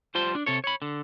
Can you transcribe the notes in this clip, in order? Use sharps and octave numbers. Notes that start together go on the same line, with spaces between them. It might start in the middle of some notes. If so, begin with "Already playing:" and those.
G3 F4 C5 A5 C6
D4
C3 A4 C#5
C#5 B5
D3